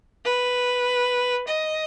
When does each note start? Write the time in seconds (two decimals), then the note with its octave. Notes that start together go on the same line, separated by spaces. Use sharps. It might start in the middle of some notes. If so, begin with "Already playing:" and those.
0.25 B4
1.48 D#5